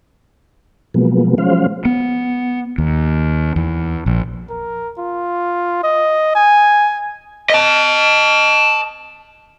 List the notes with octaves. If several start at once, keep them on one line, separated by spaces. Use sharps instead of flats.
B2 F3 F#3 G#3 A#3 B3
F3 F#3 G#3 C#4 C5 F5
B3
D#2
E2
A#1
A#4
F4
D#5
G#5
D#5 A5